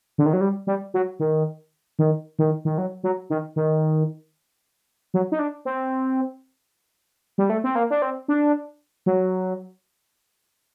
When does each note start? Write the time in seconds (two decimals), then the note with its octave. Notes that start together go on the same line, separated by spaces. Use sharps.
0.18 D3
0.26 D#3
0.33 F#3
0.41 G3
0.67 G3
0.94 F#3
1.19 D#3
1.99 D#3
2.39 D#3
2.65 D#3
2.78 F#3
3.03 F#3
3.30 D#3
3.56 D#3
5.14 F#3
5.32 D#4
5.39 D4
5.65 C4
7.38 G3
7.50 A3
7.64 C4
7.75 A#3
7.90 D4
8.02 C4
8.28 D4
9.06 F#3